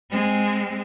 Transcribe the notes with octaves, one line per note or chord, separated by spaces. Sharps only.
G#3 C4